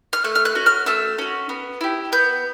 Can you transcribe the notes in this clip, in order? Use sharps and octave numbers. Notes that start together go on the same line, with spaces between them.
F6
A3 F#6
F6
F#6
C#4 F#4
F6
A3 E6
C#4 F#4
B3
E4 G4
B3 G6